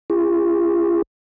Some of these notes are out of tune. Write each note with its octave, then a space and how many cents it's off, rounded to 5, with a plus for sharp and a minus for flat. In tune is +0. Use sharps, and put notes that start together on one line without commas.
F4 -45 G#4 -40